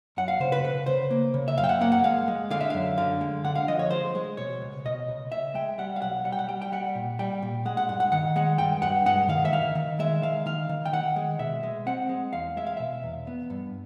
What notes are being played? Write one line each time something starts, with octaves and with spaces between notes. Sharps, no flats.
F#2 F#5
F5
C#3 C5
B4
C#3 B4
C#3 C5
A#3
C#3
E5
F#2 F5
G5
F#5
A#3 F#5
F#5
G#3 F5
G#3
D3 F5
E5
F#2 F5
D3 F5
G#3
D3 F#5
F5
F3 D#5
C#5
G#3 C5
G#3
B2 C#5
C#2
B2 D#5
C#2
C#2 E5
G#3 G5
G3 F#5
F5
B1 F#5
G3 F#5
G5
F#5
G3 G5
G5
G3 F#5
A#2
G3 G5
A#2
G#3 F#5
F#5
G2 F#5
F#5
D#3 F#5
G#3 F#5
G2 G5
G2 F#5
G#3 F#5
D#3 F5
E5
D#3 F5
D#3
G#3 E5
D#3 F5
D#3 F5
D#3
G5
D#3 F#5
G#3
B2 E5
G#3
C4 F#5
G#3
E2 F5
G#3 E5
F5
B2 E5
E2
B3
G2